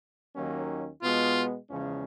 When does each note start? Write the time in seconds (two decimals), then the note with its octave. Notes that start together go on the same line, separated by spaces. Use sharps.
0.36 D#2 D#3 F#3 A#3 C#4
1.02 B2 G#3 B3 F4
1.69 E2 C#3 F3 G#3 C#4